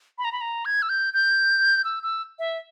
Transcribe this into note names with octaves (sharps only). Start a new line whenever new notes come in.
B5
A#5
B5
A#5
G#6
E6
G6
G6
E6
E6
E5